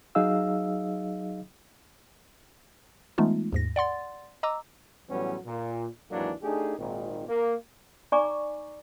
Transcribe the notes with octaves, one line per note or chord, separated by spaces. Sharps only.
F#3 D#4 G#4 D#5 F5 E6
E3 G#3 A3 B3 D#4 F4
D#2 G#2 A#6
D5 F#5 C6 A6
D#5 A#5 D6 E6
A2 E3 F#3 G3 B3 C#4
A#2
D#2 G#2 E3 F#3 A#3 D4
A3 D4 D#4 G4 G#4
G#1 A#2 D#3
A#3
D#4 D5 G#5 A#5 C#6 D6